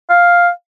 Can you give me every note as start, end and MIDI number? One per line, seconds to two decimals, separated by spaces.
0.10 0.50 77